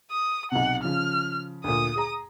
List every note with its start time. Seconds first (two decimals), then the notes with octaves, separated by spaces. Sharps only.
0.11 D#6
0.52 B1 C3 F#5
0.84 C#3 F3 F6
1.64 D2 A#2 D#6
1.96 G#4 A#5